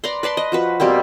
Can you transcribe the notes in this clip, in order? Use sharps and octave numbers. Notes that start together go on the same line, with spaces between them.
B4 D5 A#5 C6
B4 D5 A5 C6
D#5
F3 F#4 B4
B2 G3 A#3 C4